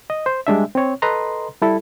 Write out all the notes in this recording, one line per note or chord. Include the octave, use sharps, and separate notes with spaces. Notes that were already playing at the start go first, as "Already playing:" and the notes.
D#5
C5
G3 G#3 D4 E5
C4 C#5
A4 B4 D#5 A#5 C6
G3 E4 A4